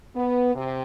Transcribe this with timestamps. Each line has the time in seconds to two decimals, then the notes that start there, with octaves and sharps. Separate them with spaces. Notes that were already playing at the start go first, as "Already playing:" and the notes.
0.15 B3
0.54 C3